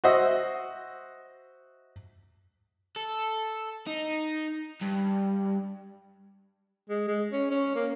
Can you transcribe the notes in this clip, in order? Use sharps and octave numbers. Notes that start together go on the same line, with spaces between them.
F#4 C5 D#5 E5
A4
D#4
G2
G#3
G#3
C#4
C#4
A#3